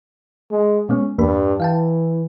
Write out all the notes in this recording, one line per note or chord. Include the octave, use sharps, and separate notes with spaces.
G#3
B2 G#3 B3 C#4
E2 G2 A#3 B5
E3 F5 G5 A5